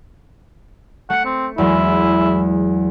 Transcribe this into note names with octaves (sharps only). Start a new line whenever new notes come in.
A3 F#5 C#7
C4
E2 F#3 G#3 E4